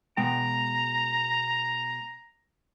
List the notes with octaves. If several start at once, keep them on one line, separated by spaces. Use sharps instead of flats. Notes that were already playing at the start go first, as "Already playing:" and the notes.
B2 G#3 G5 A#5